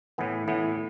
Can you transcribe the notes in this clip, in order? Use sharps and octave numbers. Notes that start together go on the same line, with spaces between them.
A2 E3 B3
A2 E3 B3